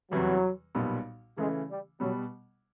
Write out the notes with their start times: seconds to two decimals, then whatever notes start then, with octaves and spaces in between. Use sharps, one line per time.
0.11 E2 C3 E3 F#3 G3
0.75 B1 A#2 G3 B3
1.37 C#3 E3 G#3 A3 C#4
1.69 G3
2.00 B2 F#3 G3 B3